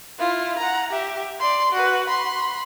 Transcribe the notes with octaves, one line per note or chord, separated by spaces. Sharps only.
E4 F4
F#5 A#5
G4 E5
D5 C6
F#4 B4
B5 C6